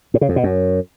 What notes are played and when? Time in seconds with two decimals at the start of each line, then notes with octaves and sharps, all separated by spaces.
0.14 A2
0.21 C#3
0.29 F2
0.36 B2
0.44 F#2